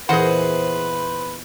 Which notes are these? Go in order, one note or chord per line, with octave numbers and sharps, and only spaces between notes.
E2 A#2 E3 G#4 B4 C5 D#5 F#5